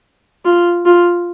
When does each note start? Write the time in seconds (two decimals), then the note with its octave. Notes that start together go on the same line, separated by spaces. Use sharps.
0.45 F4
0.85 F4